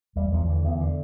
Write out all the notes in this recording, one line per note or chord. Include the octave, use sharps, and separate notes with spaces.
E2 G3
E2 F3
D3 E3
E2 E3
D3